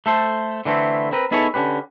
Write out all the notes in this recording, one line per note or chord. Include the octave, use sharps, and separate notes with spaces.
A3 A4 C5
D3 E3 A3 C4 E4
C4 A#4 B4
B3 D#4 E4 G#4 A4 C#5
D3 C#4 G4 B4